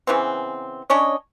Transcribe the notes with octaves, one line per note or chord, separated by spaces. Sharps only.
C#3 E3 B3 C4
C#4 D4 C#5 D#5